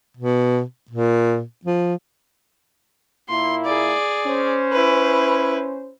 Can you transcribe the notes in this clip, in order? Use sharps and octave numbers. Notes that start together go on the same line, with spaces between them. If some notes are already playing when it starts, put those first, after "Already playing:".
B2
A#2
F3
A#2 A#3 E4 C6
G#4 D5
C#4 C5
E4 B4